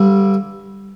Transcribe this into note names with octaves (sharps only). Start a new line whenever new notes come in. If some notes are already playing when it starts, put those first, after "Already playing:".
Already playing: G2 D3 G3